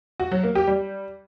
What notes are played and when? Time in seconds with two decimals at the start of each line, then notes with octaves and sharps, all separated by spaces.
0.20 F#4
0.32 F#3
0.43 A#3
0.55 G4
0.67 G3